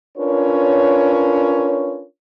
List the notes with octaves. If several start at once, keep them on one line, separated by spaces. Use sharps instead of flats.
C#4 D4 F4 A#4 B4 C#5